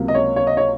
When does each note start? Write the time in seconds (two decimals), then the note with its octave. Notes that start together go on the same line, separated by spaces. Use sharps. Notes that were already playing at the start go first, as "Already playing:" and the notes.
Already playing: C#2 C3 F#3 A#3
0.08 D#5
0.15 C#5
0.36 C#5
0.47 D#5
0.57 C#5